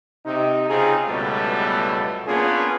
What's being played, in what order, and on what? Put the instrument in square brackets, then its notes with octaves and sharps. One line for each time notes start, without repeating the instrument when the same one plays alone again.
[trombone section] C3 D#4
C#3 C4 D#4 F4 G#4
C#2 F#2 B2 G3 A3 B3
A#3 B3 C#4 D4 F4 G#4